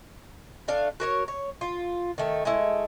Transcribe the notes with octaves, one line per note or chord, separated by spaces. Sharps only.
A3 D4 F5
F#4 A#4 C#5
C#5
F4
D#3 A3
G#3 A3 E4